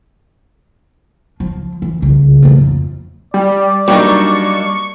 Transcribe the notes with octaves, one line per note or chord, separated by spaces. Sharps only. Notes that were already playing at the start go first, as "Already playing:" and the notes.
F3
E3
C2 C#3
A1 A2
F2
G3 D5
F#3 G3 A#3 D4 D#4 C#6